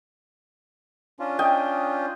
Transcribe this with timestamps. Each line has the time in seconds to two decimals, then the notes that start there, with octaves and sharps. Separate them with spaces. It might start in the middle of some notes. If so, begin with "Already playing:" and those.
1.20 C#4 D4 F4
1.39 D#5 G5